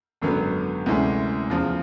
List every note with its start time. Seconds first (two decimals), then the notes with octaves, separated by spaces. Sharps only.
0.22 G#1 F#2 D3 F#3 B3
0.86 D2 C3 E3 G#3 C#4
1.50 E2 C#3 F3